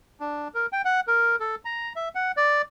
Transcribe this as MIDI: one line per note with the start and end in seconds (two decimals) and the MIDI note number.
0.20 0.48 62
0.55 0.66 70
0.73 0.82 79
0.85 1.00 78
1.07 1.36 70
1.40 1.55 69
1.65 1.93 82
1.96 2.09 76
2.15 2.32 78
2.37 2.62 74